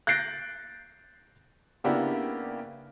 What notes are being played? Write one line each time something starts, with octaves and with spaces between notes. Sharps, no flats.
F#6 G6 A6 A#6 C7 D7
C#3 A#3 B3 D4 E4 G4